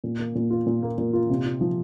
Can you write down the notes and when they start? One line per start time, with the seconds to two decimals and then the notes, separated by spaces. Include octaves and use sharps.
0.04 A#2
0.19 A#3
0.35 A#2
0.50 F4
0.66 A#2
0.83 A#3
0.98 A#2
1.13 F4
1.29 C3
1.45 F4
1.61 F3